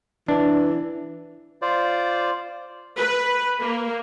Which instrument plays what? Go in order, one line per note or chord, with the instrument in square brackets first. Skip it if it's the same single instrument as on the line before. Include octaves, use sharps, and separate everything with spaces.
[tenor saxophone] E3 [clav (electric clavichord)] D4
[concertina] F4 C5 D5
[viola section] B4
A#3